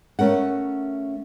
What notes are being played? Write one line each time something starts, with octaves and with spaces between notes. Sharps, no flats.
A3 C#4 A#4 F#5